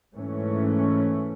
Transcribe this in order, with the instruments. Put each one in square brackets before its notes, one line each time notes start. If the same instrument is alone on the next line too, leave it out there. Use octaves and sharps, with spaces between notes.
[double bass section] G#2 E3 A3 C#4